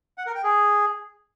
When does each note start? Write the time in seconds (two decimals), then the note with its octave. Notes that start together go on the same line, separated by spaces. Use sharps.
0.18 F#5
0.26 A#4
0.35 G5
0.44 G#4